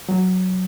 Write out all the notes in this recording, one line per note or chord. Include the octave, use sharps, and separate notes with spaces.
F#3